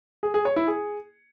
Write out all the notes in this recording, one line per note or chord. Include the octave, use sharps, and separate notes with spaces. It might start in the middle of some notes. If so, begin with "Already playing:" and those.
G#4
G#4
C#5
E4
G#4